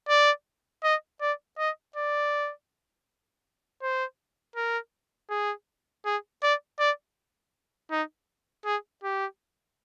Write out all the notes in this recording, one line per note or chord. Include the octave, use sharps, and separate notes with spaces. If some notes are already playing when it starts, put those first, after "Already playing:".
D5
D#5
D5
D#5
D5
C5
A#4
G#4
G#4
D5
D5
D#4
G#4
G4